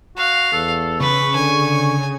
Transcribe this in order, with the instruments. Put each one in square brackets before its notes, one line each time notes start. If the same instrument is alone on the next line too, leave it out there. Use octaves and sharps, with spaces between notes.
[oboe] F#4 [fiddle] F5
[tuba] E2 [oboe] A4
[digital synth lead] C#3 [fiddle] B4 [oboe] C#6
[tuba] D3 [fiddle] G#5